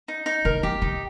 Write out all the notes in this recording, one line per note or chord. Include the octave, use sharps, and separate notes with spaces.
D#4
D#4
D#3 A#4
E3 G4
D#3 D#4